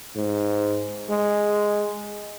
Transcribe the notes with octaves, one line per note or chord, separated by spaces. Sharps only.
G#2
G#3